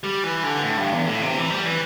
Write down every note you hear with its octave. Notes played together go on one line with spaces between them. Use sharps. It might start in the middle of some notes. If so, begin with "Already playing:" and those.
G3
E3
D3
A2
G2
E2
A2
C3
E3
G3
E3